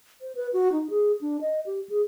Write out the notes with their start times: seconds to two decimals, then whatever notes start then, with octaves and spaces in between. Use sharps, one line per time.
0.21 C5
0.35 B4
0.53 F#4
0.72 D#4
0.90 G#4
1.21 D4
1.41 D#5
1.66 G4
1.90 G#4